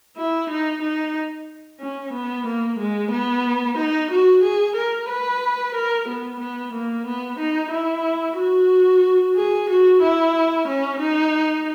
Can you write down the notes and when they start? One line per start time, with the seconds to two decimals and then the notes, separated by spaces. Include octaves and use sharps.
0.17 E4
0.50 D#4
0.82 D#4
1.81 C#4
2.13 B3
2.47 A#3
2.79 G#3
3.12 B3
3.77 D#4
4.11 F#4
4.43 G#4
4.76 A#4
5.09 B4
5.75 A#4
6.08 B3
6.40 B3
6.73 A#3
7.07 B3
7.39 D#4
7.72 E4
8.37 F#4
9.36 G#4
9.70 F#4
10.02 E4
10.68 C#4
11.00 D#4